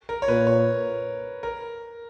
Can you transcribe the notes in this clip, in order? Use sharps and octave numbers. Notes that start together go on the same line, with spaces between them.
A#4
C#5
A#2 B4
C#5
A#4